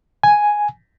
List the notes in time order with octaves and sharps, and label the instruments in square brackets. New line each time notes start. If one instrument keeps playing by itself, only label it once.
[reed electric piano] G#5